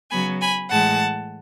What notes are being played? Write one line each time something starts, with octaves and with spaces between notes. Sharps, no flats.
C#3 F#3 B3 G#5 B5
G#5 B5
A2 E3 G#3 F#5 A5